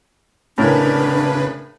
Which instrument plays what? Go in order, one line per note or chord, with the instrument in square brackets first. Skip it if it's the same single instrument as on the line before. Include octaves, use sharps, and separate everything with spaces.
[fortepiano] A2 C#4 A#4 [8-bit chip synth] C#3 B4 [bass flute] D4